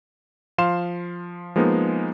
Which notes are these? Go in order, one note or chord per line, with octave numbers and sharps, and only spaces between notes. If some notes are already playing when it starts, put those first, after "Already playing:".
F3 F5 C6 E7
F3 G#3 A#3 B3 D#4